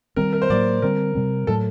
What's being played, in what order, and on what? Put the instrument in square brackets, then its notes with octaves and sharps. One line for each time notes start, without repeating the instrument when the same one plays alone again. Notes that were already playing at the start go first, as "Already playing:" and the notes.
[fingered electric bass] D#3 G3 C4 [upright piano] A#4
[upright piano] A#4
C5
[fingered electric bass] A2 F#3 A#3 [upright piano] D5
[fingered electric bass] D3 G3 C4 [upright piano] A#4
[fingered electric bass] C3 G3 C4
[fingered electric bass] A2 F#3 A3 [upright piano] A4